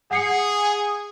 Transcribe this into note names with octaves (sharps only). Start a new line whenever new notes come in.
G#4 F#5 C7 C#7